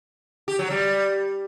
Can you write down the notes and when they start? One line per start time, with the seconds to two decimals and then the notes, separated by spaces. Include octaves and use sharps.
0.48 G4
0.59 F#3
0.70 G3